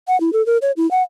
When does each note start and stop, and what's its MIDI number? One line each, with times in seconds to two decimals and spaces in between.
0.08 0.19 78
0.20 0.33 64
0.33 0.44 69
0.46 0.58 70
0.62 0.72 73
0.77 0.89 64
0.91 1.03 78